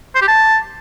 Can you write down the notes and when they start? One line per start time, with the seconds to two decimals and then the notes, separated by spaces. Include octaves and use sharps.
0.15 C5
0.22 G4
0.28 A5